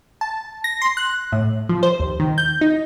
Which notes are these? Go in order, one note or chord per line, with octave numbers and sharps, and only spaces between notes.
A5
A#6
C6
F#6
A2
F3
C5
D#2
D#3
G6
D#4